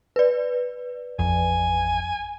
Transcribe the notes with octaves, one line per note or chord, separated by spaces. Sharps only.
B4 D5
A1 F2 G#5